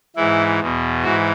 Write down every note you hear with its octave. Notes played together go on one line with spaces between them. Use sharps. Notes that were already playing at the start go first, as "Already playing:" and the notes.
G#2 E3 E4
E2 B2
G#2 E3 F#4